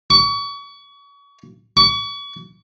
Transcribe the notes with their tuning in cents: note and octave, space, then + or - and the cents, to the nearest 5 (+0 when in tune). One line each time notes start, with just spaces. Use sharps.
C#6 +35
C#6 +40